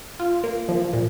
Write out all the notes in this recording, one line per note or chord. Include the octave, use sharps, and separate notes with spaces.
F4
A#3
F3
A#2